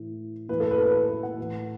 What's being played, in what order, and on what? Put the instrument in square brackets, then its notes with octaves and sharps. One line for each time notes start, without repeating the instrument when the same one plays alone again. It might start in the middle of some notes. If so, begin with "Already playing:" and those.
Already playing: [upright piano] A2 E3
A2 E3 B4
A4
B4
A4
B4
B4
B4
F#5
A2 E3